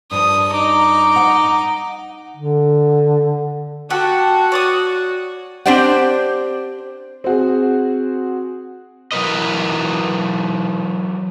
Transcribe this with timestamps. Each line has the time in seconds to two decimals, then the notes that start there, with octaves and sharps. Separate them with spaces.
0.11 G2 F3 D#6
0.54 D#4 D6
1.16 F#5
2.37 D3
3.90 F#4 G4 A4 F#5
4.52 C#5 D5 D#6
5.66 C4 D4 G4 C5 D5 F#5
7.24 C4 F#4 G#4
9.12 E3 F#3 A#4 B4 D#5